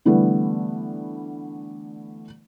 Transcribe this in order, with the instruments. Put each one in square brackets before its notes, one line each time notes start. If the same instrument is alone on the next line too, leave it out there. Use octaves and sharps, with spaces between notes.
[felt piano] D3 E3 G3 A3 B3